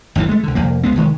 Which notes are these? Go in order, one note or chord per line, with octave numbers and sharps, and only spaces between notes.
G1 D2 B2 E3
G#3 A3
C2 D3
C2 F2 A#3
C#2 G#3 B3 C4
F1 D#3 G#3